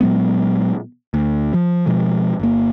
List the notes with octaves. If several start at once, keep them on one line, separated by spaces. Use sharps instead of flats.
A#2 F#3 G#3 B3
D2
F3
B2 F3 G#3
G1 A#3